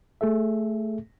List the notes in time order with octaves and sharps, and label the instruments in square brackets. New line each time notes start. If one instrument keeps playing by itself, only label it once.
[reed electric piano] A3 G#4 A4 E5